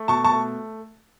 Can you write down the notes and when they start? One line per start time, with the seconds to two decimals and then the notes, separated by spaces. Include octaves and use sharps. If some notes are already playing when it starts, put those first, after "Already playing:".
Already playing: A3
0.08 B2 A5 C#6
0.24 A5 C#6
0.32 A3